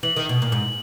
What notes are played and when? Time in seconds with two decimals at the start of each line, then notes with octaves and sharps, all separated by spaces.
0.03 E3 F#7
0.16 D#3
0.29 B2
0.42 A#2
0.52 G#2